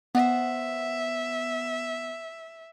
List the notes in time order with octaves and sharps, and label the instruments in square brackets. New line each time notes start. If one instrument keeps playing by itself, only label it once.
[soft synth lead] B3 [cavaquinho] C5 F#5 [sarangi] E5